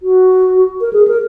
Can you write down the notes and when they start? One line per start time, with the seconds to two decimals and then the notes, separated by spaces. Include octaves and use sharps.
0.02 F#4
0.81 A#4
0.93 G#4
1.07 A#4